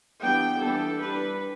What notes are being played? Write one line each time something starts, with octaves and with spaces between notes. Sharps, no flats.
E3 G3 B3 D4 G5
E3 B3 D4 A4
G3 D4 B4